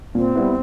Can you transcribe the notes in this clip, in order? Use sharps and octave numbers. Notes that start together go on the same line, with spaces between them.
A#2 C4
G3 B3 E4